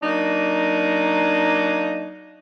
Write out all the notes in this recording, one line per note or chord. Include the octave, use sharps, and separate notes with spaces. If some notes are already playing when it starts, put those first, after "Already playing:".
F#3 A#3 D4 D#4